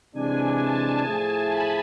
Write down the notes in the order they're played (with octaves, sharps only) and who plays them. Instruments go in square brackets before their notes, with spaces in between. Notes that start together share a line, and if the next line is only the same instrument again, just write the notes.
[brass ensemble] C3 E3 G#3 D4 [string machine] G#5
[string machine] A5
[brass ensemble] A2 F3 A3 E4 G#4 [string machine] A5
[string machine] B5